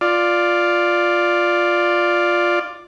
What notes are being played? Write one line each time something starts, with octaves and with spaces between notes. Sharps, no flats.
F4 D5